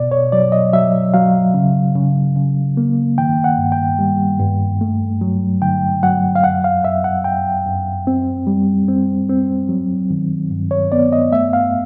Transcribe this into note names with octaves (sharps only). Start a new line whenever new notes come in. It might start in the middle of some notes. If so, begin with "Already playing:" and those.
Already playing: B2 D5
C#5
F#3 D5
D#5
F#3 E5
F#3 F5
C#3
C#3
C#3
A#3
D#3 G5
F#5
G2
G5
G3
G2
A3
F#3
D3 G5
F#3 F#5
F5
F#2 F#5
F5
F#2 E5
F#5
F#2 G5
F#2
C4
G3
C4
C4
F#3
D#3
G2
C#5
B3 D5
D#5
A3 E5
F5